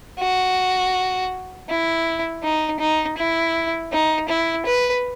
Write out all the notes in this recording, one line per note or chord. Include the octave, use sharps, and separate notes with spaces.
F#4
E4
D#4
D#4
E4
D#4
E4
B4